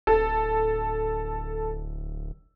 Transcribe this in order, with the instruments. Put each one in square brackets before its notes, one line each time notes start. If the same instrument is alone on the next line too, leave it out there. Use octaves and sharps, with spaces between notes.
[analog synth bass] D1 [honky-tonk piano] A4